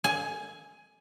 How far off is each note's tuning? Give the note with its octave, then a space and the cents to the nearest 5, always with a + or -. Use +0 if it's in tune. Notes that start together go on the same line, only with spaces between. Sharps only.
G#5 +15